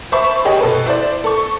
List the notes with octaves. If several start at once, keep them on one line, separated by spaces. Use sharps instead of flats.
C5 E5 A5 B5 C#6
G4 G#4 C#5 D#5
B2 A4 B4
E4 C5 D5
A4 C#6